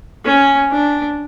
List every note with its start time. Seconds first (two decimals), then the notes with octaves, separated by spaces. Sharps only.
0.25 C#4
0.71 D4